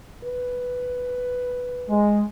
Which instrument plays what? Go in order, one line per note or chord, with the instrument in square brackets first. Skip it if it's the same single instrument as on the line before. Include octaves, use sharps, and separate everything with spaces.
[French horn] B4
[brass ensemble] G#3